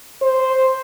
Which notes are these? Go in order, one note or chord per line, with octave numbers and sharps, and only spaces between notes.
C5